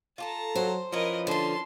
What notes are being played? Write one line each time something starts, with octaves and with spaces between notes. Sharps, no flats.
F4 G4 A4 A5 A#5
F#3 C5
F3 C#4 E4 A#4 B4 D#5
D3 F4 A5 C6